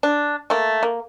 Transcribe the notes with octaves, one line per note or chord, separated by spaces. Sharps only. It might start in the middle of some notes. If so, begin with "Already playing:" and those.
D4
A3 A#3
A#3